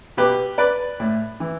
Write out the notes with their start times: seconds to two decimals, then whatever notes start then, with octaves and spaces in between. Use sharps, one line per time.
0.17 B2 G4 B4
0.58 B4 D5
1.00 A2
1.40 E3